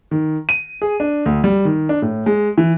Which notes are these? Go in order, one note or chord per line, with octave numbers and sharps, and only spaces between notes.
D#3
D#7
G#4
D4
D2
G3
D#3
D4
A2
G#3
E3